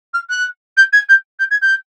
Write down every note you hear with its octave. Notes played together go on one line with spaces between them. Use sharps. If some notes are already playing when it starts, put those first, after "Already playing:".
F6
F#6
G6
G#6
G6
G6
G#6
G6